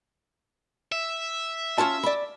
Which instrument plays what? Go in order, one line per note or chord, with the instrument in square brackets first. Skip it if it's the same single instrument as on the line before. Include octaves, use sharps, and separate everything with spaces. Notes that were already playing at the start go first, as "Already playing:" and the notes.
[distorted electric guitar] E5
[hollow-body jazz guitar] C#4 F4 A5
D5 B5